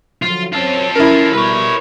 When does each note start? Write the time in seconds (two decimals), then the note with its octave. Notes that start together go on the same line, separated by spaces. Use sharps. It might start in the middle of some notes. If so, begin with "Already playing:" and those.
0.22 D3 F3 F#3 F4
0.52 F#2 C4 F4 A4 C#5
0.95 C#4 E4 A#4
1.33 B2 G3 B4 C#5